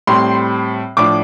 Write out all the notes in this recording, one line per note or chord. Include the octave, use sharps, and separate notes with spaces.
A2 G3 C4 C6
A2 F3 D4 D6